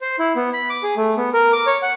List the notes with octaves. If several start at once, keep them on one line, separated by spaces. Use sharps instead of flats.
C5
E4
B3
B5
D6
G#4
A3
B3
A#4
D6
C#5
F#5